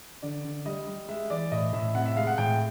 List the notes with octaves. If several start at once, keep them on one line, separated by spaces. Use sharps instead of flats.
D3 D5
D3
G3 D#5
G3
G#3 E5
E3 D5
A2 D#5
A2 E5
C3 F#5
E5
G#3 F5
F#5
A2 G5